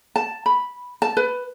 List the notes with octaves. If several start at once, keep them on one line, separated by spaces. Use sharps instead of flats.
A5
B5
A5
B4